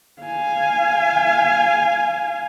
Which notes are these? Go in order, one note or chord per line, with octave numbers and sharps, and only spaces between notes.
F5 G#5